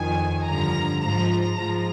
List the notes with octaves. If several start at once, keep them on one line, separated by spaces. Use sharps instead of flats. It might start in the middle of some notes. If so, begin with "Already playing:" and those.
Already playing: F2 D#3 G#5
G2 D3 F3 A#5
G#2 F3 A#5
G#2 F3 A#5